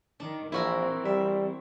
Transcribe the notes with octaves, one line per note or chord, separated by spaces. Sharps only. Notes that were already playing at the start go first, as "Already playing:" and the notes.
D#3 D4
A#1 E3 C4 E4 F#4 A#4
G3 E5